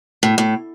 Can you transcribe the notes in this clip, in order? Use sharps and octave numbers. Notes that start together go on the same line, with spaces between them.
A2
A2